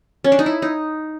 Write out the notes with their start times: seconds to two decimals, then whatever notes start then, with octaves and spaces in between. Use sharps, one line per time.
0.24 C#4
0.32 D4
0.39 D#4
0.46 E4
0.62 D#4